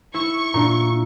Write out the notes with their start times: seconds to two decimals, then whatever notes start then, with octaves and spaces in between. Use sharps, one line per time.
0.14 E4 C#6
0.54 A#2 D4 A#5